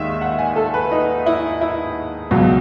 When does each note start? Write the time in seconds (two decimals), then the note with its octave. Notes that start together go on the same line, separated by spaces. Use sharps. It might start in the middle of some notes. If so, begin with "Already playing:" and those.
Already playing: D#2 D#3 G#3 D#5 E5
0.21 F#5
0.39 G#5
0.56 A4
0.74 B4
0.91 D#4
1.26 E4
1.61 E4
2.31 C#2 B2 F#3